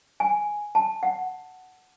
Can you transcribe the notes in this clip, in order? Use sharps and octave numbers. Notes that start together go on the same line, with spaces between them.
G#5
A5
F#5